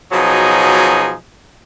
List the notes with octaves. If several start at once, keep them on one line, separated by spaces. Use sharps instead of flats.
B2 F3 F#3 D#4 G#4